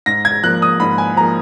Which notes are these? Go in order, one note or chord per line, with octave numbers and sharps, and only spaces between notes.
G#2 A#6
G#6
F3 A#3 F#6
D#6
G#2 B5
G#5
F3 A#3 A#5